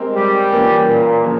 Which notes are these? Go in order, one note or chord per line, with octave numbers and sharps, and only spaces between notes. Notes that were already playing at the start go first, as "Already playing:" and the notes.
Already playing: G#3 C4 G4 A#4
G3
E3 A#3 C#4 F4
A#2
C#3 F3 A#3 C#4